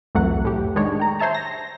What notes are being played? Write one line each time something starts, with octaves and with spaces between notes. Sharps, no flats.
C2 F2 E3 F#3 A3 F#5
A2 G4
D#3 G#3 D4 C#5
G5 A#5
C5 C#5 E5 A5 A#5
A#6